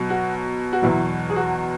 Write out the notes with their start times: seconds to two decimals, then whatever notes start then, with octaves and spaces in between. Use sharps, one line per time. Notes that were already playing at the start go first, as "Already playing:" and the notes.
Already playing: B2 F#3
0.10 F#4
0.73 F#4
0.82 E2 B2 F#3 E4
1.30 G#4
1.36 F#4